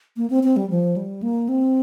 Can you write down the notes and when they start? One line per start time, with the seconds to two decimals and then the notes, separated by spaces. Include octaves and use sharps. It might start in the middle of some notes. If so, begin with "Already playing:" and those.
0.17 A#3
0.30 C4
0.43 C4
0.57 G3
0.70 F3
0.96 G3
1.23 A#3
1.49 C4